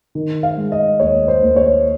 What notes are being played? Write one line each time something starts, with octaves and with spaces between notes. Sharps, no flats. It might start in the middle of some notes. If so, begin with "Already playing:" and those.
D#3
F5
G#3
D#5
D#2 C#5
C5
D#2
C#5